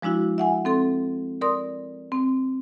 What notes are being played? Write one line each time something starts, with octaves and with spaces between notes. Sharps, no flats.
F3 G#3 D4 E4 F#4
E5 F#5 G#5
C4 A4 C6
A#4 D5 C6 D#6
C4